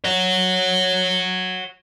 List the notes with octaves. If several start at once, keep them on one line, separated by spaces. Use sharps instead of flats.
C#5 F#5